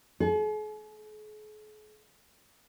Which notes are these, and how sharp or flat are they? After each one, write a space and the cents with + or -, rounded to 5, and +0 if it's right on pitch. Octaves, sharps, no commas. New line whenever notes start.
G#4 +45